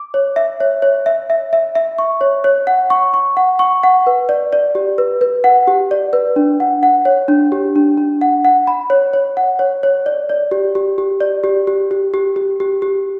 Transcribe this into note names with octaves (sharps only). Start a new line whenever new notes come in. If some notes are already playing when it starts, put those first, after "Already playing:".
Already playing: D6
C#5
E5
C#5
C#5
E5
E5
E5
E5
C#6
C#5
C#5
F#5
C#6
C#6
F#5
C#6
F#5
B4
D5
D5
G4
B4
B4
F#5
G4
D5
B4
D4
F#5
F#5
C#5
D4
G4
D4
D4
F#5
F#5
B5
C#5
C#5
F#5
C#5
C#5
D5
D5
G4
G4
G4
D5
G4
G4
G4
G4
G4
G4
G4